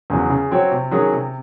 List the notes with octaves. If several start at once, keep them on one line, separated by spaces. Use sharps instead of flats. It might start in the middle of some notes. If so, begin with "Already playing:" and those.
E2 C#3 F#3 C#4
C#3
F#3 C4 F#4 C#5
C3
D#3 F#3 C#4 G#4
C3